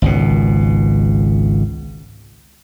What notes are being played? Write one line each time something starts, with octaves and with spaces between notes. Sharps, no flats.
G#1 C#2 B2